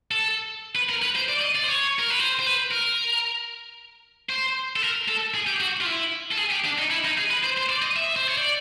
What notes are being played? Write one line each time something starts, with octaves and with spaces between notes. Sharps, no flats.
A4
B4
A#4
B4
C5
D5
D#5
D5
C5
C#5
A#4
B4
C5
C5
B4
A#4
C5
A4
A#4
A4
G#4
G4
F#4
F4
E4
A4
G#4
G4
D4
D#4
E4
D#4
G#4
B4
C5
C5
D5
D#5
E5
C5
C#5
D5